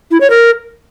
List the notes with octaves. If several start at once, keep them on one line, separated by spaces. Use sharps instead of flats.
E4
C#5
A#4